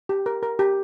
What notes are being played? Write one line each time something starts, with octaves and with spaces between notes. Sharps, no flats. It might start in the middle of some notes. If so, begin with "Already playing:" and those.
G4
A#4
A#4
G4